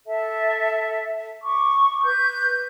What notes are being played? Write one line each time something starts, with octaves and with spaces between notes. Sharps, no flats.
A4 E5 A5
C#6 D6
B4 G6